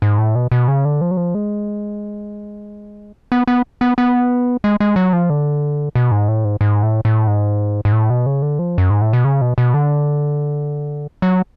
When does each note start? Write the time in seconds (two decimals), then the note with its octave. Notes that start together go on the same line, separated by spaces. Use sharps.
0.02 G#2
0.18 A2
0.35 B2
0.52 B2
0.68 C#3
0.85 D3
1.01 F3
1.11 F#3
1.17 F3
1.35 G#3
3.32 B3
3.47 B3
3.81 B3
3.98 B3
4.64 G#3
4.80 G#3
4.96 F#3
5.13 F3
5.30 D3
5.95 B2
6.11 G#2
6.28 A2
6.45 G#2
6.61 G#2
6.83 A2
7.05 A2
7.27 G#2
7.85 G#2
7.92 A2
8.10 B2
8.26 C#3
8.42 D3
8.59 F3
8.78 F#2
8.90 G#2
9.02 A2
9.13 B2
9.24 C#3
9.41 B2
9.58 B2
9.74 D3
11.22 F#3